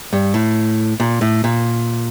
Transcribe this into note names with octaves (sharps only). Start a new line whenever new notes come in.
G2
A2
A#2
A2
A#2